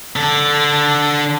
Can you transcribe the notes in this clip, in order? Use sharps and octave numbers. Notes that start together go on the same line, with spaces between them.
D3 A4